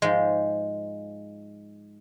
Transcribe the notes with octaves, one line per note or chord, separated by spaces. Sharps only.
G#2 F3 G#3